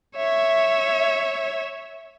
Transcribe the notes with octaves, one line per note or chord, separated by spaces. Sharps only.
C#5 E5